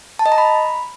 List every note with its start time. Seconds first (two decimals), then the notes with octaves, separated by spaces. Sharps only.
0.19 A5
0.26 D#5
0.32 A#5
0.38 B5